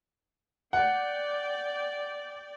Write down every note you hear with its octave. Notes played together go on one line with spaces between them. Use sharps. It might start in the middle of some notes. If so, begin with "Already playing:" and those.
D5 F#5 G5